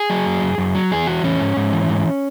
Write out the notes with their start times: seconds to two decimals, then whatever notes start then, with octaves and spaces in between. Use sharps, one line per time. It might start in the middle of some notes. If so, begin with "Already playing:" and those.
Already playing: G#4
0.10 F#3
0.26 F#2
0.42 F#2
0.58 F#2
0.75 F#3
0.91 E2 G#4
1.07 E3 F#4
1.24 E2 C#4
1.40 G#2
1.57 G#2
1.73 E3
1.89 G#2